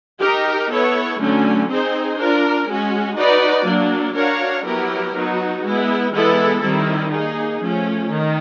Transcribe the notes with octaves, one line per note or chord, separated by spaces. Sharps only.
D#4 G4 A#4
B3 E4 A4 C#5
D3 F#3 A3 C#4
C4 D#4 G#4 C5
D4 F4 A#4
G#3 C#4 F#4
D#4 F#4 B4 D5
F#3 A#3 D4
D4 F#4 A#4 C#5 F5
F#3 B3 E4 G4 A#4
F#3 B3 D#4 F#4
G#3 B3 E4
E3 G#3 B3 E4 A4
D#3 G3 C4 E4
A#3 D#4 G#4
F3 A3 C#4
D#3